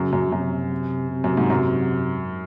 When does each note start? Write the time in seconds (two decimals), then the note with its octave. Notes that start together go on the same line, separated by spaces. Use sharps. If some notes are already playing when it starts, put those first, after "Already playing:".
Already playing: F#2 C#3
0.13 F#2
0.32 F#2 C3
1.11 C3
1.24 F#2
1.37 G#2
1.50 F#2